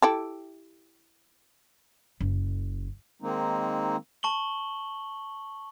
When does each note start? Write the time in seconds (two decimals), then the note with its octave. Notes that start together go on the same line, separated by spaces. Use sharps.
0.02 E4 G4 A4
2.21 F#1
3.22 D#3 G#3 A#3 C4 D#4
4.23 A5 C#6 F#7 G7